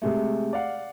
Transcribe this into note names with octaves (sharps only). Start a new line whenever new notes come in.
C3 G#3 A3
D5 F5 F#5